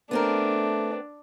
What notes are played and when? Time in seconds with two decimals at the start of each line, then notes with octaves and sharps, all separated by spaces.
0.11 A3 B3 C4 D4 A#4